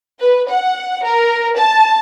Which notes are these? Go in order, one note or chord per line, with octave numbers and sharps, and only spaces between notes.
B4
F#5
A#4
A5